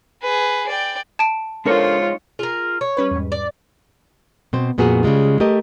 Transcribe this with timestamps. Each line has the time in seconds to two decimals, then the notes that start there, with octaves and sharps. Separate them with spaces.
0.22 G#4 B4
0.68 D5 G5
1.19 A5 D7
1.65 G#3 D4 D#4 F4 A4 A#4 C5 C#5
2.39 F4 G#4 A#4
2.81 C#5
2.97 G3 C#4 B4
3.11 E2 G#2
3.32 D5
4.53 B2 C4 C5
4.78 F2 A#2 B3 F#4 G#4
5.03 C#3 G3 G#3 F4
5.40 A3 G4 A#4 D#5